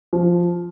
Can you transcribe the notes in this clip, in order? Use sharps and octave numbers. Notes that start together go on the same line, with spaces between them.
F3